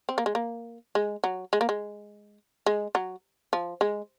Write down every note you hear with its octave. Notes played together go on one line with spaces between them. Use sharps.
C4
A#3
G#3
A#3
G#3
F#3
G#3
A#3
G#3
G#3
F#3
F3
G#3